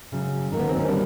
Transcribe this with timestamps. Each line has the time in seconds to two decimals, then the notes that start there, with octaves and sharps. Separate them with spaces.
0.12 F#2 C#3 F#3
0.51 D#2 D#3 F#3 A#3
0.60 B3
0.69 C4
0.78 C#4
0.88 D3 G3 A#3 D4